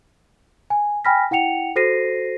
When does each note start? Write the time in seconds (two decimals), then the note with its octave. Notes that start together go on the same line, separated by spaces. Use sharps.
0.70 G#5
1.05 G5 G#5 B5 F6 A#6 B6
1.31 E4 F#5 G5 C#7 F7
1.76 F#4 A4 C5 A#6 C7 D#7